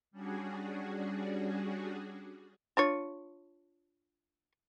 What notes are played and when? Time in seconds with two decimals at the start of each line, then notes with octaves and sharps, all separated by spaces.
0.11 G3 C#4 D4 F#4 G#4
2.77 D4 F4 C#5